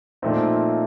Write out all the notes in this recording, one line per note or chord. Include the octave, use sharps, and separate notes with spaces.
A#2 F3 A3 C4 D#4